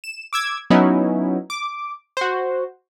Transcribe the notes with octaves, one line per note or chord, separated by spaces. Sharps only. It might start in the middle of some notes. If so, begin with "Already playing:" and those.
E7
D6 E6 G#6
F#3 B3 C#4 D#4 E4
D6
F#4 C5